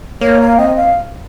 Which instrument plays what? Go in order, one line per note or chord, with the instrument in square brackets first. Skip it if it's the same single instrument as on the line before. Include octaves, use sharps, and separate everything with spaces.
[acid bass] A#3 [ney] C#5
[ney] F5
[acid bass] C4 [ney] D#5
[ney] F5